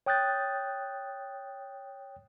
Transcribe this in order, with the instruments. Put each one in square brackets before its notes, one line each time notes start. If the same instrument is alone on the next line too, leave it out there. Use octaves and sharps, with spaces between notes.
[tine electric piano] C#5 G5 D#6 F#6 G6 A6